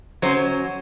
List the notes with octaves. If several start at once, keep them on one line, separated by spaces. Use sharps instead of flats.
F#3 C#4 C5